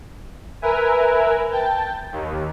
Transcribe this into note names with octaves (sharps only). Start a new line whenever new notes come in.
A#4 B4 E5 G#5
G5 A5
D#2